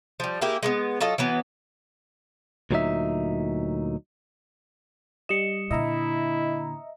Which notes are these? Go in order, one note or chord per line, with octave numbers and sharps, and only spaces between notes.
F3 G3
A#3 E4 G4 G#4
G#3 A#3 B3
F#3 F4 A4 D#5
E3 F#3 B3
D2 A#2 F#3 G#3 D#4 E5
G3 D#5 C#7 E7
A#2 D3 E4 D#5 E5 A#5